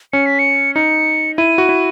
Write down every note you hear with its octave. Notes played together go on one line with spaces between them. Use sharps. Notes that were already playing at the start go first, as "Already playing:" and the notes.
C#4 C#7
B6
C#7
D#4 C#7
E4 D#7
F#4
E4